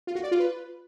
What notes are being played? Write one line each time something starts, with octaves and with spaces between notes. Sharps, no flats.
F4
F#4
D5
F4
B4